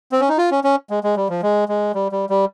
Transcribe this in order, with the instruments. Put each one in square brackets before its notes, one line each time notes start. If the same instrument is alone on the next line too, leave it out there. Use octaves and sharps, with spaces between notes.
[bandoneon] C4
C#4
D#4
F4
C#4
C#4
G#3
G#3
G3
F3
G#3
G#3
G3
G3
G3